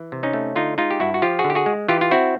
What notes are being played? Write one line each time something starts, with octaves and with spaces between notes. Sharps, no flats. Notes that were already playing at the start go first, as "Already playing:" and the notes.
Already playing: E3
C3
C#4 D#4
A3
D3 D#4 F4
G#3 D#4 F4
G4
G2 E4 F#4
F#4
F3 F4 G4
F#4 G#4
D3
G4
F#4 G#4
G#3
E3 F4 G4
F4
C4 E4 F#4